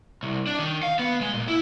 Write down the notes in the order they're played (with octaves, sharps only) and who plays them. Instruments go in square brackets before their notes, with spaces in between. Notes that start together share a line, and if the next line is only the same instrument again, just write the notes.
[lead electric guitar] C2
D4
D#3
F5
B3
G#3
A#2
E4